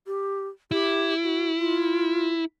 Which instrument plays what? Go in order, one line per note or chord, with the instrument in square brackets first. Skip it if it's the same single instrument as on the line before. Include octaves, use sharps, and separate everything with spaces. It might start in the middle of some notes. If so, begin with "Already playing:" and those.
[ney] G4
[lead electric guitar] E4 [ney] G4
[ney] F#4
F4